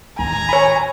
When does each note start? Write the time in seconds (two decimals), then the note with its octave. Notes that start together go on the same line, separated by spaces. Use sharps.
0.19 A1 D#2 G#5 A#5
0.49 C#5 B5